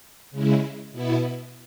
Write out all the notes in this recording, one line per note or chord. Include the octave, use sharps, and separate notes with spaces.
C#3 G#3 E4
B2 B3 E4